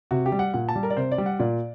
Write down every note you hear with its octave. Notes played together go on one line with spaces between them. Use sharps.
C3 F#4
G4
G3
F#5
A#2 F#5
A5
G3
A#4
D5
C3 C5
D5
G3
F#5
A#2 D5